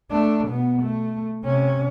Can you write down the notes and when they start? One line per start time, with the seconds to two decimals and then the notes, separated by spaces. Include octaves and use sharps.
0.11 A3 D4
0.48 B2 B3
0.82 A3
1.44 C3 C#4